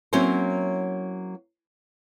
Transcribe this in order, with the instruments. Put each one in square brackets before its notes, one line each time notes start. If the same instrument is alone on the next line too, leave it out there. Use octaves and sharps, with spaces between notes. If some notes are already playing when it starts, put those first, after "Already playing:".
[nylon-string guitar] F#3 A#3 C4 C#4 E4 C5